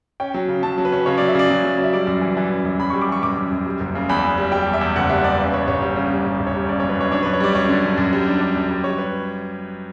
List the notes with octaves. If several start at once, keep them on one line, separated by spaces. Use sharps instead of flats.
C#4 G5
F#3
C#3
F#3 A5
F#3
B4
C#4
C#3 C#5
D5
F#3
E5
C#3 D5
F#3
F#3
F#3
E5
G3 D5
F#2
E3
E3
F#2
F#2
F#2 B5
C#6
G3
D6
E3 C#6
F#2 D6
F#2
F#2
G3
F#1
C#3
E2 B5
E2
G3
G3 G5
E2
E5
E2
F#1 F#5
G3 E5
E2 D5
C#3 B4
C#3 C#5
G1 C#5
G3
C#3
G3
G1
G1
C#5
G3
C#3 D5
C#5
F#2
B4
F#2 C#5
D4 C#5
B4
F#2
C#5
G3 D5
F#2 C#5
D3
F#2
F#2
G3
D4
D4
F#2
G3
G3 C#5
B4